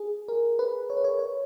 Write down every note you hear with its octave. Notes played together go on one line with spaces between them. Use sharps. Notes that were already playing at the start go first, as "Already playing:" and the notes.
Already playing: G#4
A#4
B4
C#5
B4
C#5
C#5